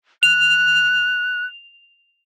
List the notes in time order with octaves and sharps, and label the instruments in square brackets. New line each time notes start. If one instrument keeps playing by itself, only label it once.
[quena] F#6 [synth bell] F7